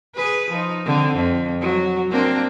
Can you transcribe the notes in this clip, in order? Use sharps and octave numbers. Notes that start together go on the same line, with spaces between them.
G#4 B4
F3 D#4
D3 C4
F2
F#3
A#3 C4 D4